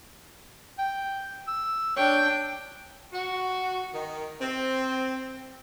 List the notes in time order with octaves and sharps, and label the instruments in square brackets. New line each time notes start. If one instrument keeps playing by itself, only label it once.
[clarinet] G5
E6
[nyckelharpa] D4 G5 [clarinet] C#5
[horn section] F#4
D#3
C4